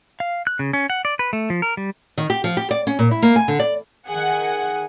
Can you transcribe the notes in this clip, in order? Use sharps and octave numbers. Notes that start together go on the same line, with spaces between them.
F5
F#6
C#3
C#4
F#5
D5
B4
A3
F3
A#4
G3
D#3
G4
F3
G4
D5
C#4
A#2
E4
A#3
G#5
D3
D5
D#3 G#4 F#5 G#5